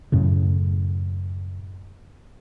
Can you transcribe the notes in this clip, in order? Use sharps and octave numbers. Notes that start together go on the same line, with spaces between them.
F#2 A2 C#3